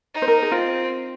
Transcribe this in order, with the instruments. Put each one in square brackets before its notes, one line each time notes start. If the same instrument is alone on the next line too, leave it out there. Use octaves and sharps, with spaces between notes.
[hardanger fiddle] D#4
[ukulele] C5
A#4
G#4
[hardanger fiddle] C4 [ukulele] F4